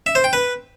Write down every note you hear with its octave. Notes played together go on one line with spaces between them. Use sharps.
E5
C5
G5
B4